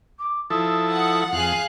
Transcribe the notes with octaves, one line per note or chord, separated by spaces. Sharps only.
D6
F3 E4 A4 D#6
F#5
F2 G#4 F5 F#6